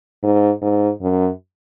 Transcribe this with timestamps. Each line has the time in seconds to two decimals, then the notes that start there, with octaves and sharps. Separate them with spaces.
0.23 G#2
0.62 G#2
1.02 F#2